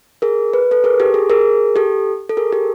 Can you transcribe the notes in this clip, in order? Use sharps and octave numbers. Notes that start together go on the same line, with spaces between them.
G#4 A#4
B4
A4 B4
G#4 A#4
G4 A4
G#4
G#4 A#4
G4 A4
A4
G#4 A#4
G4 A4